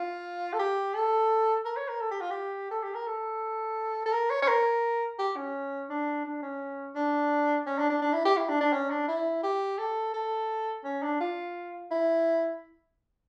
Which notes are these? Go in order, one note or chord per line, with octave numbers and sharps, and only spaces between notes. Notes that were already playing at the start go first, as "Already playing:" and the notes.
Already playing: F4
A4
G4
A4
A#4
C#5
A#4
A4
G4
F4
G4
A4
G4
A#4
A4
A4
A#4
C#5
C#5
A#4
G4
C#4
D4
D4
C#4
D4
C#4
D4
D4
D4
E4
G4
E4
D4
D4
C#4
D4
E4
G4
A4
A4
C#4
D4
F4
E4